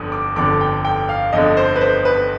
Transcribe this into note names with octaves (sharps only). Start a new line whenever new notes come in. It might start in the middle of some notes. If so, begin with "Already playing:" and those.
Already playing: G1 F2 D3 D#6
D6
G1 F2 D3 D6
G5
G5
F5
G1 F2 D3 D#5
C5
B4
C5
B4